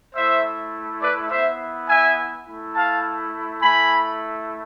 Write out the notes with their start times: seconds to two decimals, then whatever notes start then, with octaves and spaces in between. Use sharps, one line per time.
0.15 A3 E4 C5 E5
1.02 B4 D5
1.31 B3 E4 C5 E5
1.88 E5 G#5
2.46 A3 E4
2.75 F5 A5
3.61 A3 E4 G#5 B5